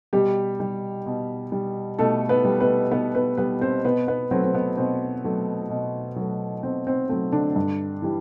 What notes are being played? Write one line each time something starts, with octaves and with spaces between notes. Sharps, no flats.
B2 G3 G4
G3
B2
G3
B2 A3 A4
B3 B4
G3
B3 B4
B2 B3 B4
B3 B4
G3 B3 B4
C4 C5
B2 B3 B4
B3 B4
F#3 A3 C4
C4
B3
B2 C4
F#3 A3
B2
F#3 A3
B2 C4
C4
F#3 A3 C4
D3 D4
G2
E3 G3